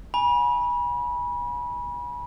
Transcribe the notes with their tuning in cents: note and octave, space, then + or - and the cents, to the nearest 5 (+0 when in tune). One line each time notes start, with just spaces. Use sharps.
G#5 +0 B5 -30